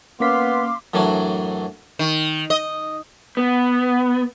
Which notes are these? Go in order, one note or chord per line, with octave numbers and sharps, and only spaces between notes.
A#3 B3 C#4 F5 C6 D6 B6
F#2 A2 E3 F#3 D4
D#3
D#5
B3